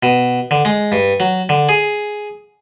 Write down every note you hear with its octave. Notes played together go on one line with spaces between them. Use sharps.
B2
D3
G#3
G2
F#3
D3
G#4